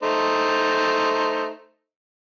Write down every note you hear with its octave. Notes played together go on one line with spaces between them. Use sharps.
A3 D#4 C5